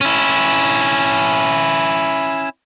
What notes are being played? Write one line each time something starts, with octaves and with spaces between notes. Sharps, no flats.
C#4 E4